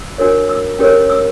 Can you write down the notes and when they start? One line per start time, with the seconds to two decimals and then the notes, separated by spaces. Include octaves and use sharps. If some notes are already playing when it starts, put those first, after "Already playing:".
Already playing: E6
0.18 D4 F#4 A#4 C#5
0.49 E6
0.79 C#4 G4 A#4 C#5
1.10 E6